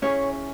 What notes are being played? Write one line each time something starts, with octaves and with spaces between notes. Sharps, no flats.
C#4 E4 G#4 C#5